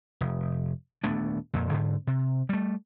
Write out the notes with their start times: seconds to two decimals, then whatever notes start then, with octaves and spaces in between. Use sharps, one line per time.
0.21 F1
1.04 D#1 A3 B3 D4
1.54 F2 A#2
1.71 G#2 D3
2.07 C3
2.49 G3 A3